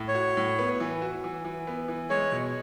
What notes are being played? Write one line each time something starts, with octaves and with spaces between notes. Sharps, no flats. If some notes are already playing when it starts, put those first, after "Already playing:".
Already playing: A2
C#5
F#4
A2
B3
E3
F#4
E3
E3
B3
E3
G#3 C#5
B2